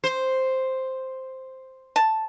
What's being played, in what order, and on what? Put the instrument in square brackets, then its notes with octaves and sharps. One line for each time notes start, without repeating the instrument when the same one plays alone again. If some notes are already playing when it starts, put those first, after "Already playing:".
[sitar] C5
[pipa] A5